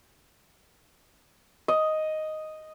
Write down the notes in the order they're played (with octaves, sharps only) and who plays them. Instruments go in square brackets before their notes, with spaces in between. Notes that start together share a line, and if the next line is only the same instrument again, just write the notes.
[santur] D#5